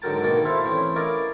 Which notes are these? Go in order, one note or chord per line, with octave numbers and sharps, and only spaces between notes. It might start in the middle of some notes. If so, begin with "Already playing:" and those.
G#2 D3 F#3 A#4 G5 A5
B2 D#3 A#3 A#4 A5
E4 A4 C5 E5 F5
A2 E3 C4 C#4
C#4 E4 A#4 D5 D#5 F5